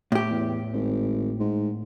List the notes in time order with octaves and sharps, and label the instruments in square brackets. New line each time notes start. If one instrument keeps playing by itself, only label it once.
[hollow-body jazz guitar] A2 G4
[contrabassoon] E2
G#1
G#2